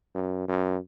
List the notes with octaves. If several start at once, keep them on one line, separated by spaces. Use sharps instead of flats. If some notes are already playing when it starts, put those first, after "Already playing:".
F#2
F#2